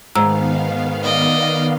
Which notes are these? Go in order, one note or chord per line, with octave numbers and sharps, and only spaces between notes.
G#2 D#3 B3 F5 A#5 E6
D5 D#5